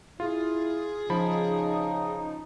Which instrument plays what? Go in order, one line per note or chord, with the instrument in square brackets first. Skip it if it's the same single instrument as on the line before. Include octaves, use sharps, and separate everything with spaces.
[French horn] E4 [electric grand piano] F4 [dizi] G#4
[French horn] C#3 [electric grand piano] F3 B5 [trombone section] D#4